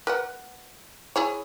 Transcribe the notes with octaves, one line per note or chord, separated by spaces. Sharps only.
A#4 B4 F#5
E4 G#4 C#5